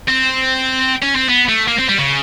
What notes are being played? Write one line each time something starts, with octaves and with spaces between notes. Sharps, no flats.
C4
C#4
C4
B3
A3
A#3
C4
G3
C#3